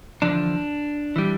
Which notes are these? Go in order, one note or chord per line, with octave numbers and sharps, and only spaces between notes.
E2 D3 F3 D4
E3 G3